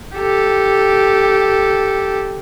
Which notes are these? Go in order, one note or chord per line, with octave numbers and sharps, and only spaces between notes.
G4 A4